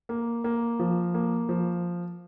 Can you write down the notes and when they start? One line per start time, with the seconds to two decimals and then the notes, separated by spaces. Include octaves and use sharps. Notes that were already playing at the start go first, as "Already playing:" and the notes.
0.09 A#3
0.44 A#3
0.79 F3
1.14 A#3
1.49 F3